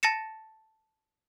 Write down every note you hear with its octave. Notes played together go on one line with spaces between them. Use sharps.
A5 A6 A#6 C#7 E7